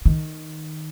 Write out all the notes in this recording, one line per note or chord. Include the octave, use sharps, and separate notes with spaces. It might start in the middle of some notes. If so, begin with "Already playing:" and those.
D#3